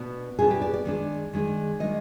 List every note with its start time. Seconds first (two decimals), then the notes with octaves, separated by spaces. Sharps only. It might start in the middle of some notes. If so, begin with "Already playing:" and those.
Already playing: B2 B3 D4
0.38 B2 B3 D4 G#4
0.51 G4
0.62 D5
0.74 D5
0.85 D#3 G#3 D4
1.33 D#3 G#3 D4
1.80 D#3 G#3 D4 D#5